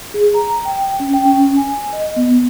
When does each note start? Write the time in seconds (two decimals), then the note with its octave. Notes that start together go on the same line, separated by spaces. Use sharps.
0.14 G#4
0.34 A#5
0.65 G5
1.00 C#4
1.14 G5
1.25 C#4
1.57 G#5
1.93 D#5
2.16 B3